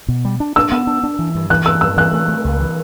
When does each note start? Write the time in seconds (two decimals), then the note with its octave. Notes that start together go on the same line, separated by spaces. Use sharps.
0.08 B2
0.25 G3
0.40 D4
0.56 D4 E6
0.72 B3
0.87 D4
1.03 D4
1.19 E3
1.35 G2
1.50 E3 F#6
1.66 G2 E6
1.81 G2 E6
1.97 E3 F#6
2.13 A3
2.28 A3
2.44 C#2
2.60 E3